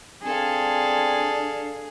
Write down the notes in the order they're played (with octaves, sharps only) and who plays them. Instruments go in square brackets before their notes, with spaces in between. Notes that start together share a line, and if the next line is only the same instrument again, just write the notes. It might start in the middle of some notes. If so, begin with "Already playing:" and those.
[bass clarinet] C4 [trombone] D4 [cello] G#4 [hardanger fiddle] A4 F5